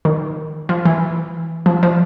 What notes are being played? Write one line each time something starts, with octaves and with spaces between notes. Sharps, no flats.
D#3
F3
E3
F3
F3